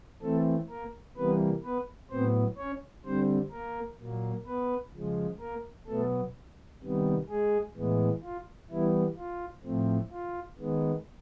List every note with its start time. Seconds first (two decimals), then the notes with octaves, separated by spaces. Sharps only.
0.22 E3 A3 C4 A4
0.70 A#3 A#4
1.16 C3 E3 G3 A#3 B3 B4
1.63 B3 B4
2.10 A2 F#3 B3 C4 C5
2.58 C#4 C#5
3.05 D3 G3 C4 C5
3.51 A#3 A#4
3.98 A#2 F#3 A#3
4.46 B3 B4
4.93 C#3 F3 G#3
5.40 A#3 A#4
5.87 B2 F#3 A3 B3 A4
6.81 C3 D#3 G3 B3
7.29 G#3 G#4
7.75 A2 E3 G#3 B3
8.23 F4
8.70 E3 G3 B3 E4
9.17 F4
9.64 A2 F3 A3 C4
10.11 F4
10.58 D#3 G#3 B3